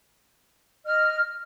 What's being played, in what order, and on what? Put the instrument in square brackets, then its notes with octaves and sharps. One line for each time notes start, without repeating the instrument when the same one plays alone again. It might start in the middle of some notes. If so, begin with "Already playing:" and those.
[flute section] D#5 F6